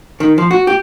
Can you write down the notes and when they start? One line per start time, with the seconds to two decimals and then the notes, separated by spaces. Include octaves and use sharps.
0.20 D#3
0.38 F3
0.51 F#4
0.67 G4